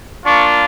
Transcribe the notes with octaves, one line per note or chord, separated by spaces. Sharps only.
A#3 D4 F4 C#6